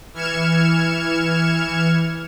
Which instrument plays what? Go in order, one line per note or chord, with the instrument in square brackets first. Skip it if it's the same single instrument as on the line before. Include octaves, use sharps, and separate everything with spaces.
[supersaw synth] E3 F6 G#6 C#7 E7